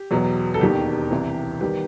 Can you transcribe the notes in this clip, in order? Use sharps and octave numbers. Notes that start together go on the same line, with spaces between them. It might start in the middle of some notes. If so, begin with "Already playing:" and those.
Already playing: G4
E2 B2 F#3 B3
A4
E1 D#2 D#3 G4
C2 C3 E3
D#3 G3 B3 G4